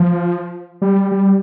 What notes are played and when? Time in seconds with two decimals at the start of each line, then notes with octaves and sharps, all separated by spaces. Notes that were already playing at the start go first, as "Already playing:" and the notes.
Already playing: F3
0.82 G3
1.12 G3